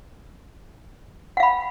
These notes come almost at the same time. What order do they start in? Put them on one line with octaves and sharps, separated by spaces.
F#5 F5 B5